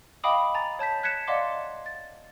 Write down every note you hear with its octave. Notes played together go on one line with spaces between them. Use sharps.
D#5 F5 G5 B5 D6 D#6
G#5 A#5 A6
C#5 A5 G6 B6
F#6 G#6 B6 C#7 E7
D5 D#5 F5 F#5 C6 D6
A6